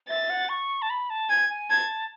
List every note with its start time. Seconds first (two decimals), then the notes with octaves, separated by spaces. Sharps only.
0.09 E5 A6
0.30 F#5
0.49 C#6
0.82 A5
0.90 B5
1.10 A5
1.29 G#5 G#6
1.50 G#5
1.70 A5 G#6